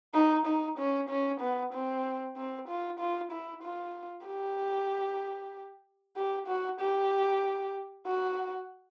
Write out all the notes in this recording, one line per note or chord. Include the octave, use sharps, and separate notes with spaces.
D#4
D#4
C#4
C#4
B3
C4
C4
F4
F4
E4
F4
G4
G4
F#4
G4
F#4